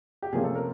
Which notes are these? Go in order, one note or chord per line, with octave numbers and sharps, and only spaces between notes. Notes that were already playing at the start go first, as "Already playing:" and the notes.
G4
C3 F3 A#3 C#4 G#4
A4
A#4